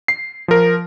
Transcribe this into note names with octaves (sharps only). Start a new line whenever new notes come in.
C7
F3 A#4